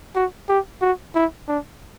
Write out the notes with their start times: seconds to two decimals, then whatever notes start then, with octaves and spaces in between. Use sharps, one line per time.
0.15 F#4
0.49 G4
0.82 F#4
1.15 E4
1.48 D4